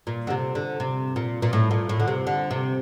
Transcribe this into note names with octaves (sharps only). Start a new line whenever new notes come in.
A#2
D3
C3
D3
C3
A#2
A#2
A2
A#2
A2
D3
C3
D3
C3